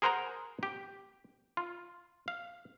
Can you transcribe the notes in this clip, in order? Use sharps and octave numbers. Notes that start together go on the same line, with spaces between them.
G#4 A#4 C5 F#5 G#5 A#5
G4
F4
F5